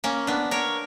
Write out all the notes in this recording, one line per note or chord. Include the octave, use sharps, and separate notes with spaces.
A#3 C#4
B3 D4
A#4 C#5